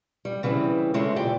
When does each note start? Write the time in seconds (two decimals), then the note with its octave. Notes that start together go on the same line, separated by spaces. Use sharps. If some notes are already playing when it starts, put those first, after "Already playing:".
0.25 G3
0.43 C#3 E3 G3 C4
0.94 C#3 G#3 E4 A4 C5
1.16 E2 A#2 G4 D5